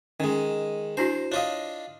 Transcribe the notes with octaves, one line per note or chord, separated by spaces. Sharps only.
D#3 G#3 C#4
D4 E4 F#4 C5
D4 F4 C#5 D#5 F5